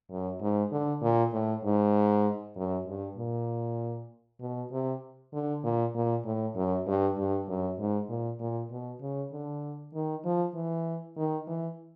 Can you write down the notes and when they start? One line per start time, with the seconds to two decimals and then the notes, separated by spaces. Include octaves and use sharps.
0.10 F#2
0.41 G#2
0.72 D3
1.02 A#2
1.33 A2
1.64 G#2
2.56 F#2
2.87 G2
3.17 A#2
4.40 B2
4.72 C3
5.33 D3
5.63 A#2
5.94 A#2
6.25 A2
6.55 F#2
6.87 G2
7.17 G2
7.48 F#2
7.79 G#2
8.09 A#2
8.40 A#2
8.71 B2
9.01 C#3
9.32 D3
9.94 D#3
10.24 F3
10.54 E3
11.16 D#3
11.47 E3